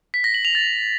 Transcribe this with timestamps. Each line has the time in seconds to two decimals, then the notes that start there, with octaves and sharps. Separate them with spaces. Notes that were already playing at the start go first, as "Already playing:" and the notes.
0.14 B6
0.24 A#6
0.34 F#7
0.45 F7
0.55 A6